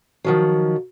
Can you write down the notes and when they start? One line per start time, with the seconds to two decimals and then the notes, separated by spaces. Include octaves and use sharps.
0.24 D#3 F3 F#3